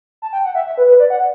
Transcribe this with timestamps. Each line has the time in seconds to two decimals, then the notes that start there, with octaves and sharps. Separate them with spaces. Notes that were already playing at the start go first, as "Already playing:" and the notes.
0.22 A5
0.33 G5
0.45 F#5
0.55 E5
0.66 E5
0.78 B4
0.88 B4
1.00 D5
1.10 F#5